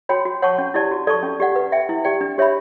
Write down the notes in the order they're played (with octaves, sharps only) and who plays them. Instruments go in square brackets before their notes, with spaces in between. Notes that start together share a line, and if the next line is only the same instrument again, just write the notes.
[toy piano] F#4 C#5 G5 B5
F#4
C#5 F#5 A5 C#6
C#4
E4 G4 D5 A5
F#4
A4 D5 A5 C#6
C#4
G4 D5 F#5
B4
E5 G5
E4
G4 D5 G5
D4
G4 C#5 E5 B5